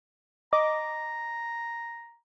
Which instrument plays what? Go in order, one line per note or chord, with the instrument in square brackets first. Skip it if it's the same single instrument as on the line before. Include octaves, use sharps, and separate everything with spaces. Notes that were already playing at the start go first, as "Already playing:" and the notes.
[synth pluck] D#5 D6 [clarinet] A#5